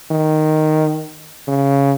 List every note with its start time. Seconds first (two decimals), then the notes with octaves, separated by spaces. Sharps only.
0.11 D#3
1.47 C#3